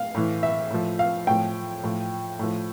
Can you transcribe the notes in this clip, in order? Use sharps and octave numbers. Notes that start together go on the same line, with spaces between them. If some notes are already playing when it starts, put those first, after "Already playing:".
Already playing: F5
A2 E3
E5
A2 F3
F5
A2 F3 G5
A2 F3
A2 F3